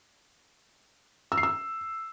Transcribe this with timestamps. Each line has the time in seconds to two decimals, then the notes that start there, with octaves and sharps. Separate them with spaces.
1.32 E6
1.37 C7
1.43 E6